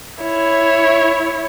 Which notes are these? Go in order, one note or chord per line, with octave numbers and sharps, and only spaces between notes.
E4 C#5